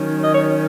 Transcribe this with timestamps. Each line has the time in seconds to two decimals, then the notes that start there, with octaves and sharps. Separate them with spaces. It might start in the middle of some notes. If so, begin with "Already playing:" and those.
Already playing: D#3 F#3 C#4
0.23 D#5
0.34 C#5